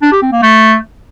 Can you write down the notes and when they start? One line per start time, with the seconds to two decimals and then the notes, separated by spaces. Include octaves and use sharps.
0.02 D4
0.12 G4
0.22 C4
0.32 A#3
0.42 A3